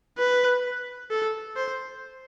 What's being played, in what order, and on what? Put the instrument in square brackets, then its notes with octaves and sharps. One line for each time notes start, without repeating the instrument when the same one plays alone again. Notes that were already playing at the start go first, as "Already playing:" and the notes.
[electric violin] B4
A4
C5